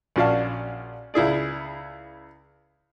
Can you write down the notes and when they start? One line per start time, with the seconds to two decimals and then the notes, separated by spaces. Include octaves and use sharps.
0.16 A#1 C#4 F#4 D5 F5 A5
1.14 C#2 E4 G#4 D5